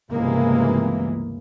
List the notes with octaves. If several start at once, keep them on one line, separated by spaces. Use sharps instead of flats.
G1 C#2 C3 E3 G#3 A#3